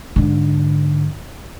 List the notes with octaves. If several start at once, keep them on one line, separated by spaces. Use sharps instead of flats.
G#2 D3